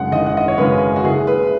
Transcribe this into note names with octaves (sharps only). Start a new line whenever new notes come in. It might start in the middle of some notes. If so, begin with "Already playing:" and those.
Already playing: F#2 C#3 G#3 C#4 F#5
G#1 D#5
F#5
D#5
C#5
F#2 C#3 G#3 C#4 B4
F#4
F#1 G#4
B4